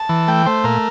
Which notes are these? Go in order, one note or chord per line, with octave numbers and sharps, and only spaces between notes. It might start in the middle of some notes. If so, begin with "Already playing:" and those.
Already playing: A5
E3
A3 G5
A3 C5
A#2 A#4